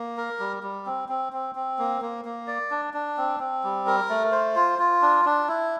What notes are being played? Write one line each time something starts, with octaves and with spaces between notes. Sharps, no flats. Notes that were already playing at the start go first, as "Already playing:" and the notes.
Already playing: A#3
A#4
G3
G3
C4
C4
C4
C4
A#3
A#3
A#3
D5
D4
D4
C4
C4
G3
A#4
A3
C5
F4
F4
D4
D4
E4